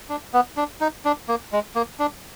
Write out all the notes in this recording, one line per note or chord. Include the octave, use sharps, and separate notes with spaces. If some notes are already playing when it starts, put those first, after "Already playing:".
D4
B3
D4
D#4
D4
A#3
G#3
A#3
D4